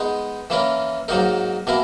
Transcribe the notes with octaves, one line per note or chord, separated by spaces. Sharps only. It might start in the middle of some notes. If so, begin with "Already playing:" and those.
Already playing: G#3 B3 D#4
E3 A#3 C#4 E4 A#4
G#2 F#3 A#3 D#4 A#4
B2 A#3 E4 A#4